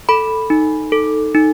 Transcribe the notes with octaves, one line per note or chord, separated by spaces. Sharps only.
A4 B5
D#4
A4
D#4